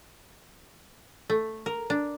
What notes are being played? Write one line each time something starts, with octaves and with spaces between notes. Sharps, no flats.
A3
A#4
D4